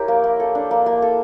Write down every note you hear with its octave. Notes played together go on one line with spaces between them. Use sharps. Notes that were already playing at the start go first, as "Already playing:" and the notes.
Already playing: E4 G4 A#4 C#5
A#3
A#3
A4
D4
A#3
A#3
A4